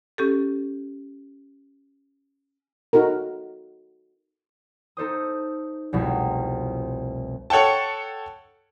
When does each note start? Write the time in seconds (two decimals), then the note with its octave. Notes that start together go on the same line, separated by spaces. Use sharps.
0.18 C#4 G4 A4
2.93 D#4 F#4 A4 A#4
4.97 D#4 A4 C5 D#6
5.93 F1 C2 B2
7.50 A4 C#5 F#5 G5 A5